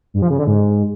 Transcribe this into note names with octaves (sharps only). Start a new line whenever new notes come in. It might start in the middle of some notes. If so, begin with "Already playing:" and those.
G2
F3
C#3
D3
G#2